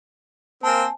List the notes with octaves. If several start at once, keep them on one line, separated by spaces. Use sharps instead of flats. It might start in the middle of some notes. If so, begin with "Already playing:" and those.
A#3 C4 G#5 A5